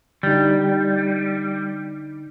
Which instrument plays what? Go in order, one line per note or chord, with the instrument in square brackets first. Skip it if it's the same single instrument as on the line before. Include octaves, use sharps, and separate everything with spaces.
[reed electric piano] D3 D#4 [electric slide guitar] G3